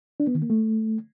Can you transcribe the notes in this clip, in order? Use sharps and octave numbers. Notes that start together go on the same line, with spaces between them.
D4
B3
D#3
A#3
A3